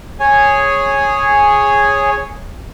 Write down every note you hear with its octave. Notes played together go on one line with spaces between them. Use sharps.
G#4 C#5 G#5